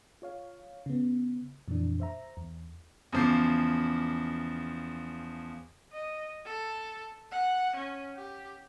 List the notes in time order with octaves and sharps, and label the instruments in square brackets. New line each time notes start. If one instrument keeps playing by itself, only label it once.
[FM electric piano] F4 C#5 F5
C#3 B3
F2 A#2 E3 D4
C5 E5 A#5
E2
[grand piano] E2 C#3 F3 D6 C7
[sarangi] D#5
A4
F#5
C#4
G4